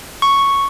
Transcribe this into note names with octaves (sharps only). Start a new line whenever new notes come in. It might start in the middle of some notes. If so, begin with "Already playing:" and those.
C#6